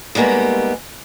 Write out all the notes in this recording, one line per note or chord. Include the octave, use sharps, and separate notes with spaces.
D#2 G3 G#3 A#3 B3